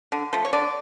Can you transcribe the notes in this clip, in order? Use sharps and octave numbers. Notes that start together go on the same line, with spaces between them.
D3
F3 A3
C#5
D3 D5